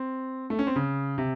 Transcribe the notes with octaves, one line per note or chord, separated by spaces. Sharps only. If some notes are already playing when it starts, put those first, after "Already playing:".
Already playing: C4
A3
C#4
C4
C#3
C3